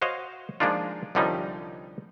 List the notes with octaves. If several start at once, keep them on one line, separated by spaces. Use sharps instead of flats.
F#4 C5 C#5 D#5 F5
F3 G#3 A#3 D4 D#4 F4
C2 D3 F3 G3 C#4 D#4